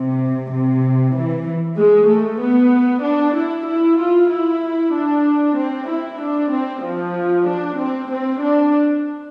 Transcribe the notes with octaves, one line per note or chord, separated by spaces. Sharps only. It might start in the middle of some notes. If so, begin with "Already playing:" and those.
Already playing: C3
C3
E3
G#3
A3
B3
D4
E4
E4
F4
E4
D4
C4
E4
D4
C4
F3
D4
C4
C4
D4